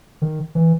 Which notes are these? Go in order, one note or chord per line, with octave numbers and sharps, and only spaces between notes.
D#3
E3